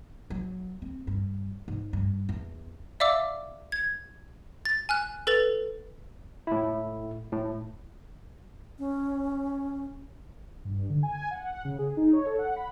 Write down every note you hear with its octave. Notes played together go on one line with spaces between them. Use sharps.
F#3
C4
G2
G#2
G2
E2
D5 E5 F5 D6 E6
G#6
A6
G#5 F6 F#6
A4 B4 A6 F7
A2 E4
A2
C#4
G2
D3
G#5
F#5
C#3
G#4
D#4
C#5
A4
F#5
B5